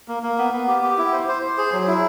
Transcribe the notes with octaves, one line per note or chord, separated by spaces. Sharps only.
A#3
A#3
B3
B3
G4
G4
E4
C5
C5
C5
G#4
F#3
E4